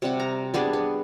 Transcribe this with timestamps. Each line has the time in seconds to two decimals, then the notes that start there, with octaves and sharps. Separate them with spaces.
0.02 C3 G3 F#5
0.20 A#5
0.54 G3 B3 D4 G#4
0.73 B3